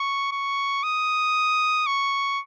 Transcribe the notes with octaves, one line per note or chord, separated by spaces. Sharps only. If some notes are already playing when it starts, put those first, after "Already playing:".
Already playing: C#6
C#6
D#6
C#6